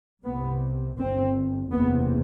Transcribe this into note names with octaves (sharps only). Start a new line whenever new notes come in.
C2 C3 B3
G1 G2 C4
F#1 E2 C3 B3